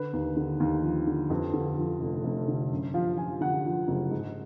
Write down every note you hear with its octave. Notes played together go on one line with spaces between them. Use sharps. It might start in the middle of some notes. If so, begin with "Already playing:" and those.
Already playing: D3 B4
D#2
D3
D#2
F3
D3
F2 B4
D3
F3
F1
F1
D3
F#2
F3 F5
F3 G#5
D3 F#5
F3
F#1
G#2